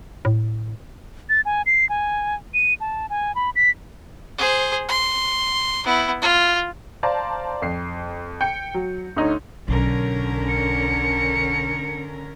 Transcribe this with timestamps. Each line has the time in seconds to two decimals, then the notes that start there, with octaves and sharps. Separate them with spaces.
0.25 A2
1.29 A6
1.45 G#5
1.66 C7
1.89 G#5
2.54 D#7
2.80 A5
3.10 G#5
3.35 B5
3.56 B6
4.38 G#4 C5
4.89 C6
5.85 B3 E4
6.22 F4
7.03 C5 D5 F5 A5 A#5
7.62 F2 C7
8.41 G5 G6 C#7
8.74 F#3
9.16 D2 D#4 C#5
9.68 B1 D3 C#4 A#4
10.48 C#7